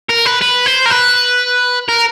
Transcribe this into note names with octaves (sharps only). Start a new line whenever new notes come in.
A#4
B4
B4
C5
A#4
B4
A#4